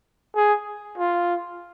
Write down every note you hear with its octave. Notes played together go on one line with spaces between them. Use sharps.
G#4
F4